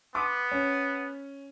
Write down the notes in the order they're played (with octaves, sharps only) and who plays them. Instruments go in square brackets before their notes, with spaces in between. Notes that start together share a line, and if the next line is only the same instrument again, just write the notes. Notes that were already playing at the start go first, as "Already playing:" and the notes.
[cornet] B3 [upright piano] C6 D6 D#6
[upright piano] C#4